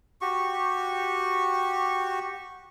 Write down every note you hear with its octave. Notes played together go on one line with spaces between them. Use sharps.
F#4 G4 C#6